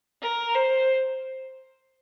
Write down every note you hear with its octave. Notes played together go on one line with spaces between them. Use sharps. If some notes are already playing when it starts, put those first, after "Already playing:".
A#4
C5